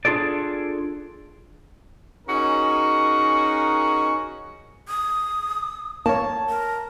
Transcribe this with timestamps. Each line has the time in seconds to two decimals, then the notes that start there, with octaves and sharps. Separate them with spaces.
0.05 D4 F4 G#4 A4 D5
2.28 C#4 D#4 F#4 G#4 A#4
4.88 D#6
6.06 A#3 C#5 A5
6.50 A#4